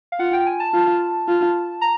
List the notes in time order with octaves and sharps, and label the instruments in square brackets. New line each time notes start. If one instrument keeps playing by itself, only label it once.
[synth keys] F5
[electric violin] F4 [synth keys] F#5
[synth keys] G5
G#5
A5
[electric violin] F4
F4
[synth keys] A#5